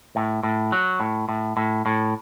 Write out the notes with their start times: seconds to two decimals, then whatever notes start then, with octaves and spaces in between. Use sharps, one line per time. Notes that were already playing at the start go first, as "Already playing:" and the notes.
0.16 A2
0.43 A2
0.72 F#3
1.00 A2
1.29 A2
1.57 A2
1.86 A2